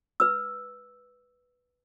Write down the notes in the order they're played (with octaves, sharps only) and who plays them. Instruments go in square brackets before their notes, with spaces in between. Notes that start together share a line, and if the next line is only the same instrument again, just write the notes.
[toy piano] B4 E6